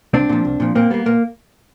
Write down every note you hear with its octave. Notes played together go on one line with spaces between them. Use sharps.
C2 C4 D4
A#2 F3
C2
A#2 F3
A#2 A#3 C4
G3 A#3 B3
A#2 A#3